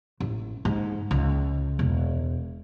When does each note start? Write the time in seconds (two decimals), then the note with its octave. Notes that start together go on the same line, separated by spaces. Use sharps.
0.20 A1
0.65 G#2
1.11 C#2
1.79 E1